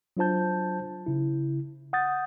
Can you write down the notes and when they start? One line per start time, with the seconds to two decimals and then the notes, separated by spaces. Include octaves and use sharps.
0.17 F#3 D4 F4 C5 A5 G6
1.06 C#3 E4
1.93 F#5 D#6 G6 A6